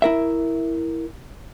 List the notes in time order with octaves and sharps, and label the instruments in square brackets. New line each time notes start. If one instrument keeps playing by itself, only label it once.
[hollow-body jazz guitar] E4 A#4 E5